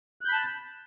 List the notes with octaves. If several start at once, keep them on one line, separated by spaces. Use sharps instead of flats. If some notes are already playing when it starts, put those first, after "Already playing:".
A5 B5 F#6 G6